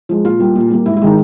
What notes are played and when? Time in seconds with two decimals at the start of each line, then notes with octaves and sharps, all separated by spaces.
0.09 F3 G#3
0.25 A#2 F4
0.39 G3 A#3
0.55 A#2
0.70 G3 A#3
0.86 G#2 E4
0.97 E4
1.02 D#3 G#3 D#4